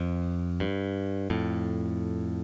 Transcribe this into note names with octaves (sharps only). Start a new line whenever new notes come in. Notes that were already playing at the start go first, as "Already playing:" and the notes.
Already playing: F2
G2
F2 A2